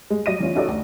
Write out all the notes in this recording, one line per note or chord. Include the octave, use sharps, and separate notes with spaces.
G#3
F#3 D5 D#5 A#6 D#7
E3 C#4 F4
C#4 D#4 F#4 A4 D5 D#5
D2